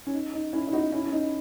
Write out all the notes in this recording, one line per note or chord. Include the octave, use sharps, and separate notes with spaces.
C#4
D#4
D#4
C#4 E4
E4
D#4 F#4
C#4 E4
C#4
D#4